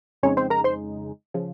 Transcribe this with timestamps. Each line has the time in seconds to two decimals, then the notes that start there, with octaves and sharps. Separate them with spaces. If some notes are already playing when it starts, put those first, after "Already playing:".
0.23 F2 C#3 G#3 C4 C#4 D#4 C#5
0.37 C4 C5
0.50 A#4 A#5
0.64 C5 C6
1.34 C#3 F3